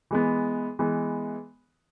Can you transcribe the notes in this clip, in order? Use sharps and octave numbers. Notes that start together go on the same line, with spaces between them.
E3 G#3 B3
E3 G#3 B3